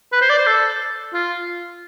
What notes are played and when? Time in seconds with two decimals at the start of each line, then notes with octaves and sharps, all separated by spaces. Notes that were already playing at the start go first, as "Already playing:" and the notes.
0.12 B4
0.22 C5
0.30 D5
0.39 C5
0.47 A4
1.13 F4